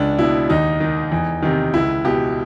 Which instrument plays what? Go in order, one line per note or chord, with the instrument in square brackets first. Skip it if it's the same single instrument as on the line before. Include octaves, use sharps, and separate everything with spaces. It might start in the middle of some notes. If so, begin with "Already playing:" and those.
Already playing: [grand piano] C#2 D4
B2 E4
D#2 D#4
D#3
E2
C3 D#3
C#2 E4
B2 G4